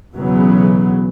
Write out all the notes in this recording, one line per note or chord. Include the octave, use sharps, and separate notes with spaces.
B1 E2 C#3 E3 F#3 B3